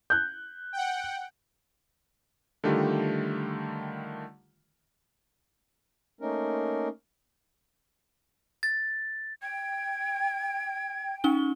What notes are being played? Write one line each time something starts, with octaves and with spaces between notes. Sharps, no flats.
F#6 G6
F#5 G5
D3 D#3 G3 A3 F4 G4
A3 A#3 C#4 D#4 A#4
A6
G5 G#6
C#4 D#4 C#6 G7